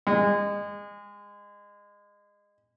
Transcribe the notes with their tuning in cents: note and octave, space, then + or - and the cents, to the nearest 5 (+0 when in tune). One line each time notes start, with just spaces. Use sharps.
G#3 -25